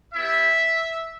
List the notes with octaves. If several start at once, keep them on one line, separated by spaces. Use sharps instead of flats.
B3 E4 G4 E5